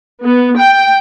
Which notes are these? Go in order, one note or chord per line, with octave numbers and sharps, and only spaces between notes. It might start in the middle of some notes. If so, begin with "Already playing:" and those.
B3
G5